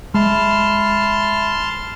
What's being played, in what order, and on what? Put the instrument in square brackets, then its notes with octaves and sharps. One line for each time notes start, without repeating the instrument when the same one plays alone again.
[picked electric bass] G#3 [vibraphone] E5 B5 [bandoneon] A5 C6 F6